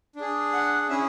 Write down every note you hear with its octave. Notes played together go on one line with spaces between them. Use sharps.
D4 G#4
F#5
C#4 E4 G#4 E5